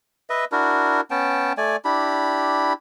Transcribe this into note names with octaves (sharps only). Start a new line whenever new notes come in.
B4 D#5 E5
D4 E4 F#4 A#4
B3 C#4 G5 A5
A3 D5 G#5
D4 E4 G4 B5